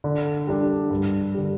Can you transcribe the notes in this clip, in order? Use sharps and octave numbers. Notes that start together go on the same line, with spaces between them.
D3
G3 D4
G2
D3 G3